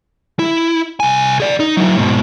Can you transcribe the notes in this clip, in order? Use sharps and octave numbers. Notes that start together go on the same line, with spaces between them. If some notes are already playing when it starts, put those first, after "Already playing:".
E4
C2 G#5
G#4 D5
D#4
F#3 E4
G#2 B2